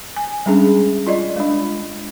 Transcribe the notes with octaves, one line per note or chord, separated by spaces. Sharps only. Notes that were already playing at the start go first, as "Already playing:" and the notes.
G#5
G3 G#3 C#4 D4 G#4
F4 D5 D#5
G#3 D4